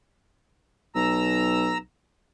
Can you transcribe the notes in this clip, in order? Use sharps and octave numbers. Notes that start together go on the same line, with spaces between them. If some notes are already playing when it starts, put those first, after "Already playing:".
B1 A#5 E6